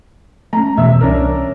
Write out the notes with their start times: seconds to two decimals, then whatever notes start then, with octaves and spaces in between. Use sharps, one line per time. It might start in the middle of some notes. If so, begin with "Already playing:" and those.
0.53 A3 C#4 A#5
0.77 E1 B2 E3 E5 E6
1.01 C2 C#4 D4 A#4